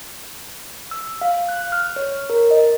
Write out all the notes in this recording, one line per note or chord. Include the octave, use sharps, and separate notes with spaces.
E6
F5
F#6
F6
C#5
A#4
D#5